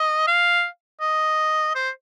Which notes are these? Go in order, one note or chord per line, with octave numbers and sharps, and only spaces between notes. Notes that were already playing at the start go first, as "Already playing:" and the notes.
Already playing: D#5
F5
D#5
C5